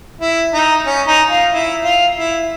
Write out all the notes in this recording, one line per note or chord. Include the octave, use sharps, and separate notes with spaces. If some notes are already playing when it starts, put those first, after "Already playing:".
E4
D#4
C#4
D#4
F4
E4
F4
E4